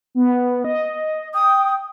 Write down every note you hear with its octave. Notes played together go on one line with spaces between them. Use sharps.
B3
D#5
G5 D#6